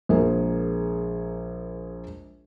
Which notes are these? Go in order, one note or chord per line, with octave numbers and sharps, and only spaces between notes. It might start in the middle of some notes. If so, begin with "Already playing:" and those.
A#1 G#3 G#4 A#4